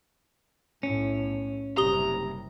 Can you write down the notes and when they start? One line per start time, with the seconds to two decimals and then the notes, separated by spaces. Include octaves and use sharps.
0.83 B1 A2 C#4
1.77 F#1 C3 G3 G4 A#5 D#6 G7